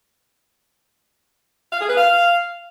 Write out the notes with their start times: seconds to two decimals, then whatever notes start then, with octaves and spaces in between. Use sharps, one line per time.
1.72 F5
1.80 G#4
1.89 B4
1.97 F5